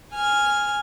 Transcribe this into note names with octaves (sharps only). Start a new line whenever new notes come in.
G#5 F6